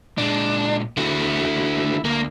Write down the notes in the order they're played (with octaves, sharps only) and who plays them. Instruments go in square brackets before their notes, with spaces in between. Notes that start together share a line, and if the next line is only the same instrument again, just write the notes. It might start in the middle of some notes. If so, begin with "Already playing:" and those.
[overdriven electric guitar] A#2 G#3 [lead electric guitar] D4
[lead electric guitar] D3 F#4 [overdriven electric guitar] E4 F#5
[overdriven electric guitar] D2 [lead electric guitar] A#3